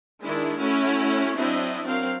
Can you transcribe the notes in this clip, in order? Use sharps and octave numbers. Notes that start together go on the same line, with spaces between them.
D#3 G#3 D4 E4
A3 C#4 E4 F#4
F#3 C4 D4 E4 D#5 E5
F#3 C4 A#4 F5